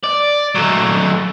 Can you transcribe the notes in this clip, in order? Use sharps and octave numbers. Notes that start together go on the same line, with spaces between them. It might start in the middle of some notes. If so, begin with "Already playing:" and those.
D5
F#3 A3